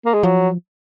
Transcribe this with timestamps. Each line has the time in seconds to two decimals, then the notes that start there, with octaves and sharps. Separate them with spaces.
0.05 A#3
0.14 G#3
0.23 F3 F#3